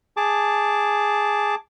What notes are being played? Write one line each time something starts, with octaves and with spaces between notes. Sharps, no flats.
G#4 A5 D6